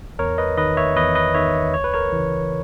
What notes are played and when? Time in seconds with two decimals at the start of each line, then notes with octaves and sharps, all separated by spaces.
0.19 E2 A#4 C#5
0.38 B4 D#5
0.57 D#3 B4 D#5
0.77 C#5 E5
0.96 E2 B4 D#5
1.15 B4 D#5
1.34 D#3 C#5 E5
1.74 C#2 C#5
1.84 B4
1.94 A#4 C#5
2.12 C#3 E3